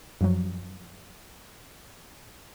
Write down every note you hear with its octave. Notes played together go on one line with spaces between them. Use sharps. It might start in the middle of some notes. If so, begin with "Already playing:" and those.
F#2 F3 F#3